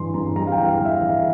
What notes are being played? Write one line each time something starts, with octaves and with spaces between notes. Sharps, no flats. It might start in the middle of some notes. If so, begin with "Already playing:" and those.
Already playing: G2 E3 C6
G2 A#5
G3 A#5
F5
G5
E3
F5
E3
E5
E3 E5